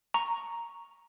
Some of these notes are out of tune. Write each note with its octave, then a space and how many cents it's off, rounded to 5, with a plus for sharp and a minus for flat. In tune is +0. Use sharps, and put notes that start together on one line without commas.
A#5 +0 C#6 +0